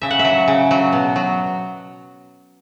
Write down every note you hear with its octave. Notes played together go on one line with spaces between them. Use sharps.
C#3 E5
F#5
E5
F#3
C#3
F#3
B2
F#3